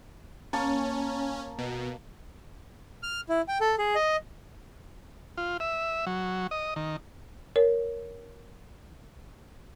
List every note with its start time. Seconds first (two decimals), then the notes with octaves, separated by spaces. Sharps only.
0.53 A#3 C#4 A5 C#6
1.58 B2
3.03 F6
3.29 E4
3.48 G5
3.61 A4
3.79 G#4
3.95 D#5
5.37 F4
5.60 E5
6.07 F#3
6.51 D#5
6.76 D#3
7.56 A#4 C#5